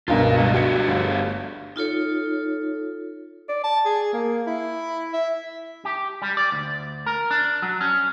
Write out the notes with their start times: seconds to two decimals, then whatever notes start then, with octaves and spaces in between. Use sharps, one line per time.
0.08 C#2 G2 B2 F4 A#4
0.36 G3 G#3 F#4
0.54 A3 D4 F#4 G4 C#7
0.88 G1
1.76 D#4 F4 A4 C#5
3.49 D5
3.64 A5
3.85 G#4
4.13 A#3
4.47 E4
5.14 E5
5.85 G4
6.22 G3
6.37 D5
6.52 D2
7.06 A#4
7.31 D4
7.62 F#3
7.81 C#4